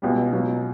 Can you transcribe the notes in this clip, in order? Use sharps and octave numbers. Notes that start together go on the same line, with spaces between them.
C#2 B2 G3
C#2 B2 F#3